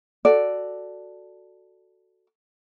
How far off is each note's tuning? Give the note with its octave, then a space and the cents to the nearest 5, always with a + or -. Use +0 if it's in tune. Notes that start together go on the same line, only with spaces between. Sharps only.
F#4 +0 A4 +5 D5 +0